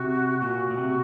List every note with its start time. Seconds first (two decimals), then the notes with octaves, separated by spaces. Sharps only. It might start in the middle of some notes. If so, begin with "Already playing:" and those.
Already playing: C3 F#4
0.41 A#2 F#4
0.70 A#2
0.77 C3